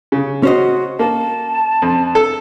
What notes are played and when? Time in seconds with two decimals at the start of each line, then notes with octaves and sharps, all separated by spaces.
0.12 C#3
0.43 C#4 F#4 C5 D#5
0.99 A#3 A5
1.82 F2
2.15 A4